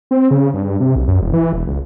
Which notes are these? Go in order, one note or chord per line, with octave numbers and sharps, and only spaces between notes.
C4
C#3
G2
C3
B1
F#2
E1
E3
E1
C#2